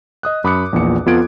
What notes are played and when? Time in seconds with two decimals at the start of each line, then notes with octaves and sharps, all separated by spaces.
0.23 D#5 D#6 F#6
0.44 F#2 B5 D6 D#6 F#6 C#7
0.73 A#1 E2 A#2 C#7
1.06 F2 B3 F4 A4 G#6 D7